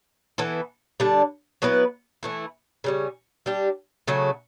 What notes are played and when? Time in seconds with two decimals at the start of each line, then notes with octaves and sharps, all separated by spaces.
0.38 E3 B3 E4 A4
1.00 D3 G3 D4
1.62 F#3 B3 E4 B4
2.23 E3 A3 E4
2.84 C#3 G3 C#4
3.46 G3 D4 G4
4.08 C#3 F#3 A3